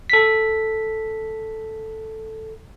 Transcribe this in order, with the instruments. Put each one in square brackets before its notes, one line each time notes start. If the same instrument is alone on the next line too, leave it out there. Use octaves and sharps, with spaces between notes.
[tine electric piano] A4 B6